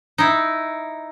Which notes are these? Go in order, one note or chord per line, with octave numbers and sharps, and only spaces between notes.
D#4 E4